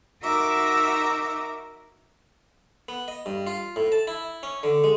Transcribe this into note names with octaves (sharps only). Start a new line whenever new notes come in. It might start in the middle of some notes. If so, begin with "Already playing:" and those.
D#4 F#4 A#4 E5 A#5 D6
B3
D#5
G2
F4
A2
A5
E4
C#4
D3
G#3